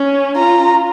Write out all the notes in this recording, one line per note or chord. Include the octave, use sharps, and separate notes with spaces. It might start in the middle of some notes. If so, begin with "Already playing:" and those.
Already playing: C#4
F4 A#5